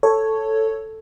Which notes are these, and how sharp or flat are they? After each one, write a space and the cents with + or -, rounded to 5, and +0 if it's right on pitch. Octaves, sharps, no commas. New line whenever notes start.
A4 +5 C#5 +0